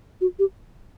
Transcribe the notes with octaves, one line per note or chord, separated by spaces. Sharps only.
F#4
G4